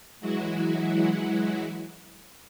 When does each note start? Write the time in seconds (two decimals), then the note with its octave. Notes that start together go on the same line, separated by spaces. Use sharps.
0.20 E3 F#3 G#3 E4 F#4